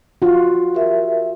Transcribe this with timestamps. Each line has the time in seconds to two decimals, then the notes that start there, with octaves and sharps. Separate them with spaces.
0.22 F4 F#4
0.75 G4 A#4 E5